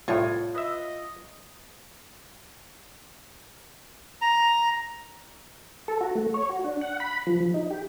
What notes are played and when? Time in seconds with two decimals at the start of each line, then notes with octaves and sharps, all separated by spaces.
0.08 C2 A2 F4 C#5
0.55 B4 D#5 E5
4.22 A#5
5.88 A4
6.01 F#4
6.15 A3
6.34 C#5
6.49 F#4
6.64 D4
6.81 F#5
7.00 B5
7.27 F3
7.40 F3
7.54 D#4
7.70 G4